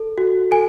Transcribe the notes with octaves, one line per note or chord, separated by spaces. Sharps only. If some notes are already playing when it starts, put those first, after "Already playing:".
Already playing: A4
F#4
A4 G#5